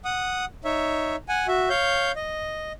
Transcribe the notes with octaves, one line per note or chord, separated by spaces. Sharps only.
F#5 D#6
D#4 C#5 E5
F#5 G#5
F#4 E5
C#5 F5 G6
D#5